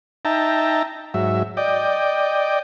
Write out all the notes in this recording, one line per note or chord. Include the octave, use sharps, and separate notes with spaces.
D#4 E5 G5 A5 A#5
G#2 F#3 E5
D5 D#5 G5